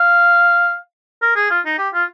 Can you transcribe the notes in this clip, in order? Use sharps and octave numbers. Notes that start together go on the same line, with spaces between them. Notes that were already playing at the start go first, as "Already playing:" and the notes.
Already playing: F5
A#4
G#4
F4
D#4
G4
F4